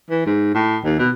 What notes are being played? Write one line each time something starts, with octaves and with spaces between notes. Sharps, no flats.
E3
G#2
A2
D#2
B2